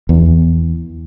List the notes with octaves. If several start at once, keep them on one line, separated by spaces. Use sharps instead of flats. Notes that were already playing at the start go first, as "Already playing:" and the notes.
E2